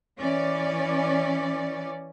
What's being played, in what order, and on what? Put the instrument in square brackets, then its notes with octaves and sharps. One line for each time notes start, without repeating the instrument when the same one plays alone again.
[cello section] E3 C#4 D5